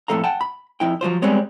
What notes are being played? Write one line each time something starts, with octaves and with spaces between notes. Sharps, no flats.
F2 A2 A#3 A4 F5 A#5
F#5 G5 A5
B5
F2 E4 G5
F3 F#3 F4 C5
G3 G#3 B3 C4 C#5 D#5